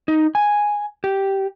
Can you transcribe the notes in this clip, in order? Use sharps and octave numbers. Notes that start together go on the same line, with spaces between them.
D#4
G#5
G4